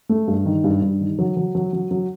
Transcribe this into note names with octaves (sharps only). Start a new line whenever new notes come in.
A3
G2
D#3
G2
G2
D#3
F#3
F#3
F#3
F#3
F#3